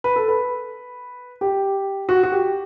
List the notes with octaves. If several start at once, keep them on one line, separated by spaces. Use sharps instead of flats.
B4
A4
B4
G4
F#4
F#4
G4